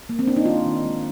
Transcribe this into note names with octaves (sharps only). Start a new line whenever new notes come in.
A#3
C4
D4
D#4
D#3 F4
D#3
G#3